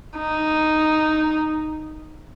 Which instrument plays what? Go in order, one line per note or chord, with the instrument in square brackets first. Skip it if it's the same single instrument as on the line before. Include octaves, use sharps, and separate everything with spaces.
[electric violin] D#4